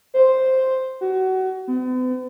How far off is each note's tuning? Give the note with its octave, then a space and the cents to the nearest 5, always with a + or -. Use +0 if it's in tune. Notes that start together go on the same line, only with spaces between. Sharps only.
C5 +0
F#4 +25
B3 +45